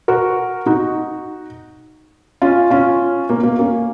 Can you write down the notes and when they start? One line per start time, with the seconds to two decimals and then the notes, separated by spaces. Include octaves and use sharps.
0.08 F#4 A#4
0.66 D#4 F#4
2.42 C#4 F4
2.70 C#4 F4
3.30 A#3
3.44 A#3
3.59 A#3 C#4